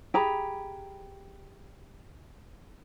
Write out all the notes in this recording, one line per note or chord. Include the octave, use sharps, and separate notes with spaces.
G4 G#4 A#5 B5